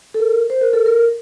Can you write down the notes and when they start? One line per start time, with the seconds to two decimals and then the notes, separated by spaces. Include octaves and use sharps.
0.14 A4
0.20 A#4
0.50 C5
0.61 A#4
0.73 A4
0.86 A#4